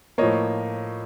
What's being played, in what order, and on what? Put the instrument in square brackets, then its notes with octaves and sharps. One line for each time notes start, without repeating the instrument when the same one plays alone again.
[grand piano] A2 F3 A#3 C#5 D#5